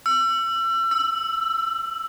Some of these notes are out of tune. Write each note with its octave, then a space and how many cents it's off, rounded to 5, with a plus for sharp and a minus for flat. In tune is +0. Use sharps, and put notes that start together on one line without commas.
E6 +35
E6 +5